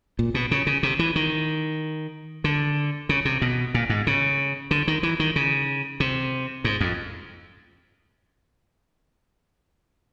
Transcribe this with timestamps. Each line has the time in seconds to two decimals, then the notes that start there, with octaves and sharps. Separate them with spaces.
0.19 A#2
0.34 B2
0.51 C#3
0.67 C#3
0.83 C3
0.99 E3
1.16 D#3
2.44 D3
3.09 C#3
3.25 C3
3.42 B2
3.74 A#2
3.90 G#2
4.07 C#3
4.71 D3
4.88 D#3
5.03 E3
5.20 D#3
5.36 C#3
6.00 C3
6.64 G#2
6.81 F2